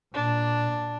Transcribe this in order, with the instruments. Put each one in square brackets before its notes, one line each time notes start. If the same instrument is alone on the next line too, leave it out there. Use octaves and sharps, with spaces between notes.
[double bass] A#2 [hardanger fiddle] D4